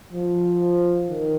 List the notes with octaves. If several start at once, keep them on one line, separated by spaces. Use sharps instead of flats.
F3
D#3